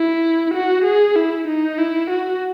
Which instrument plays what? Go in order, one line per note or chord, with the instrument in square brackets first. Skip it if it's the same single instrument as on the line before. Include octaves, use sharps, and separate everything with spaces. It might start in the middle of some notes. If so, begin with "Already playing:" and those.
Already playing: [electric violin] E4
F#4
G#4
E4
D#4
E4
F#4